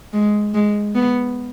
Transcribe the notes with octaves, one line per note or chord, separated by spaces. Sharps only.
G#3
G#3
B3